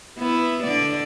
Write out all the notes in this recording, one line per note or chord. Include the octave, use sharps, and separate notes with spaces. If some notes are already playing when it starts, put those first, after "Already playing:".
B3 E4
D3 D5